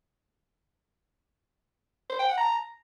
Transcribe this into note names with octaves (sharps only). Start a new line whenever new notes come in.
C5
G5
F#5
A#5